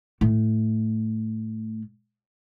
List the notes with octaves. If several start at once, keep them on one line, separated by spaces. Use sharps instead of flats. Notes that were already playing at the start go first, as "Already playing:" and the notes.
A2 A3